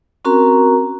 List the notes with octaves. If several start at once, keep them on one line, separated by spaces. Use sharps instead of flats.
C4 C#4 F#4 A#4 A#5